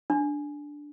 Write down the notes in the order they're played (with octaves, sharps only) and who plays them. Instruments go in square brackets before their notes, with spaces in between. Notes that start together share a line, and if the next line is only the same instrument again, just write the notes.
[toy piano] D4